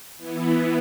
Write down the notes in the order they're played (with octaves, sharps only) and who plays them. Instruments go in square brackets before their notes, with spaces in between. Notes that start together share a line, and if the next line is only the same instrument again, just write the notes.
[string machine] E3 B3 E4